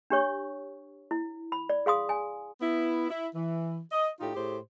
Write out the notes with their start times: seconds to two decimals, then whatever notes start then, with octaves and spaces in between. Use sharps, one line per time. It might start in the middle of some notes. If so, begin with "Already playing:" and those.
0.10 D4 G4 C#5 C#6
1.11 E4
1.52 B5
1.69 D5
1.86 G#4 F5 C6 D#6
2.09 G#5
2.61 B3 E4
3.10 E4
3.34 E3
3.91 D#5
4.20 A2 D#4 F4 G4
4.35 A2 G4 G#4 C5